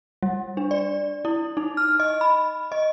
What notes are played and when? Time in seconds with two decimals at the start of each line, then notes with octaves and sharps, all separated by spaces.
0.23 G3
0.57 D4
0.71 D5
1.25 E4
1.57 D#4
1.77 F6
2.00 D#5
2.21 B5
2.72 D#5